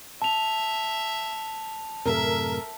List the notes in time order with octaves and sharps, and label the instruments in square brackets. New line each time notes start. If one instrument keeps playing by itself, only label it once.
[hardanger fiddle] E5 [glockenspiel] A5 F7
[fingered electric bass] F#2 A2 C3 [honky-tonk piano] A4 A#4 [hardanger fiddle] E5